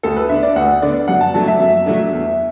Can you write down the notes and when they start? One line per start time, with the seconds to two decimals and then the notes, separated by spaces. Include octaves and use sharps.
0.03 D2 A4
0.16 B4
0.29 D3 B3 D4 E5
0.43 D5
0.56 D2 F#5
0.82 D3 B3 D4 D5
1.08 F#2 F#5
1.21 A5
1.34 F#3 A3 D4 A5
1.48 E5
1.60 F#2
1.86 F#3 A3 D4
2.13 E2